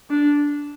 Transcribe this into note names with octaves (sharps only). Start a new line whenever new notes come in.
D4